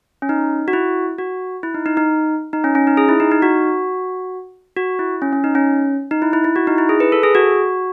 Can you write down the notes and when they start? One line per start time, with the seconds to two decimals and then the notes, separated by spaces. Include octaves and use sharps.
0.22 C#4
0.29 D#4
0.68 F#4
0.73 E4
1.18 F#4
1.63 E4
1.74 D#4
1.86 D#4
1.97 D#4
2.53 D#4
2.64 C#4
2.75 C#4
2.87 D#4
2.97 G#4
3.09 E4
3.20 D#4
3.31 D#4
3.42 F#4
4.77 F#4
4.99 E4
5.22 C#4
5.33 C#4
5.44 D#4
5.55 C#4
6.11 D#4
6.22 E4
6.33 E4
6.44 E4
6.56 F#4
6.67 D#4
6.78 E4
6.89 G#4
7.00 B4
7.12 A4
7.23 G#4
7.35 F#4